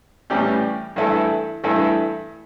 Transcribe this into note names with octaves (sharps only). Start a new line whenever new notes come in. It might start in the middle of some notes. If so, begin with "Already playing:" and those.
A2 E3 G3 C#4 G4
G2 E3 A3 E4 A4
G2 E3 A3 E4 A4